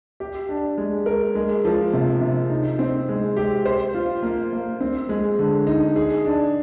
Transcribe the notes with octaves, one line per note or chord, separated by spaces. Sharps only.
G4
D4
G#3
A#4
G#3
F3
C3
C3
D#4
C4
G#3
G4
C5
F4
A#3
A#3
C4
G#3
D3
D#4
G#4
D4